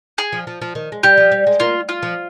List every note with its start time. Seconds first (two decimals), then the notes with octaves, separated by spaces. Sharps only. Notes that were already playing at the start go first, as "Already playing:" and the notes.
0.18 G#4
0.32 F3
0.47 F3
0.62 F3
0.75 D#3
0.92 G#3
1.03 G3 G4
1.17 F3
1.32 G3
1.47 G#3
1.60 A#3 F4
1.89 F4
2.03 F3